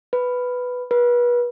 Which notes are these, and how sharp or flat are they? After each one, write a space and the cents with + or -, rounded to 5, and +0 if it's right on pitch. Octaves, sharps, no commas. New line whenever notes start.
B4 +5
B4 -35